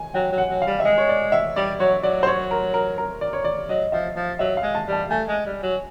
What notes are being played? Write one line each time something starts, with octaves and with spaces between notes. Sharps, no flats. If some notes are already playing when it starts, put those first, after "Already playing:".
Already playing: G#5
F#3 G5
F#3
F#5
F#3
F5
G3
E5
G#3 D#5
C#5
D5
E5
G3 D5
F#3 C#5
F#3 D5
C5
C#5
A#4
A#4
A#4
D5
C#5
D5
F#3 D#5
F3 E5
F3
F#3 E5
F5
G#3
A5
G3
A5
A3 G#5
G#3
G3
F#3